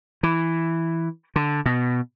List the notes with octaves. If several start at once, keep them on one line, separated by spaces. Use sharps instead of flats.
E3
D3
B2